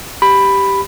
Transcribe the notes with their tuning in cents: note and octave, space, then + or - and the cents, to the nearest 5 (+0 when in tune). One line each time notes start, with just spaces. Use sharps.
G4 +0 B5 +5